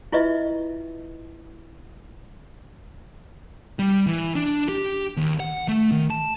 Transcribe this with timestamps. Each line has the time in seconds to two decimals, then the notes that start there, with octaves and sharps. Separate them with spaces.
0.12 E4 F4 B4 D#5 E5
3.79 G3
4.07 E3
4.36 D4
4.69 G4
5.17 D#2
5.40 F#5
5.68 A3
5.92 D#3
6.10 A5